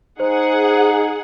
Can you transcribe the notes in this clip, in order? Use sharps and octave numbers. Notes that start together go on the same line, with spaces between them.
D#4 G#4 C5 F#5